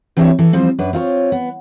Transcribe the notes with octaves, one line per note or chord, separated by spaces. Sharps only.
E3 C4 D4 G4 C#5 E5
E3 A4
F3 G3 C4 C5
F#2 D4 B4
C4 F4 A4 C#5
B3